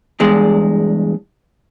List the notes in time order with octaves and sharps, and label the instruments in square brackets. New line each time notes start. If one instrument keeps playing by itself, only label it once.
[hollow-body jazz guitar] E2 G2 G#3